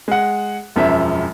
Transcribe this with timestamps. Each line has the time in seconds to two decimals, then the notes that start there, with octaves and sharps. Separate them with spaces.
0.08 G#3 F#5
0.76 E1 F#2 F3 E5